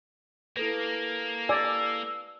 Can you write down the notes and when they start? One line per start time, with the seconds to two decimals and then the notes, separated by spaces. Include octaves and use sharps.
0.57 A#3 E4 A4 B4
1.49 D5 G#5 E6